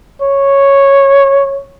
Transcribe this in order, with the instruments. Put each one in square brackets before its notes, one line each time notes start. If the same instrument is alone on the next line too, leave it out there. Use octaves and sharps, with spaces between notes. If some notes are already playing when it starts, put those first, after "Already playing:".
[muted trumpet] C#5